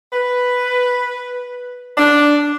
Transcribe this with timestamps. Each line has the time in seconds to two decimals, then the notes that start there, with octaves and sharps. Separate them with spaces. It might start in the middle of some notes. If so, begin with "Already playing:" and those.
0.13 B4
1.98 D4